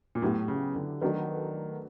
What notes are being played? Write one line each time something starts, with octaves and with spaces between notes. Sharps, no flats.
A#2
A2 F#3 B3 E4 G4
C#3
D3
D#3 F#3 A3 D4 F#4 B4